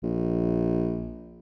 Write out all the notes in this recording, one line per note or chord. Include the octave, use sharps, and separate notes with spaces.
A#1